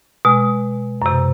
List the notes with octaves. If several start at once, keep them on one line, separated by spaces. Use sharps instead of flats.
B2 G#3
F#2 C3